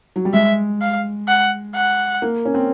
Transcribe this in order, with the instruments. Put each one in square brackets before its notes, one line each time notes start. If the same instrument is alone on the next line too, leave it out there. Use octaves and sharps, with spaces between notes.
[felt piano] F#3
G3
[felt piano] G#3 [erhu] E5
[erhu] F5
F#5
F#5
[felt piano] A#3
C#4
C4